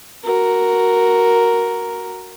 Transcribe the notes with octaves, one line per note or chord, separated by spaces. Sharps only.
F#4 A#4